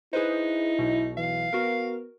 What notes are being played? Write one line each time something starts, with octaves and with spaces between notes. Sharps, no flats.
D#4 E4 G#4 B4 C5
B1 B2
E3 F5
B3 F#4 A#4